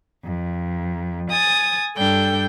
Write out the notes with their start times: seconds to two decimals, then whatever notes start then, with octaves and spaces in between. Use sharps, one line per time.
0.23 F2
1.29 G#5 D#6 A6
1.96 G2 G3 D4 A4 G5 G6